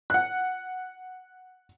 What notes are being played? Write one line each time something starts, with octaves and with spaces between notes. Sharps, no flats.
F#5 F#6